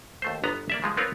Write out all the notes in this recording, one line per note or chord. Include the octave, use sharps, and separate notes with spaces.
D#2 A3 C5
G1 B3 D#5 A#5
A#3 D5 E5
C#3 F3 G#3
B3 C4 F4 A#4 B4 C#5